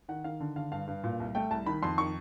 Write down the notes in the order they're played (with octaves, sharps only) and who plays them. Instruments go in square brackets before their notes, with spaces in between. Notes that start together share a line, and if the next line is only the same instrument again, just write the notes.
[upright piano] D#3 F#5
D#3 F5
D3
D3 F5
G2 F5
G2
A#2
C2
A3 G5
C2 A5
D#3 B5
F2 C6
D#3 C#6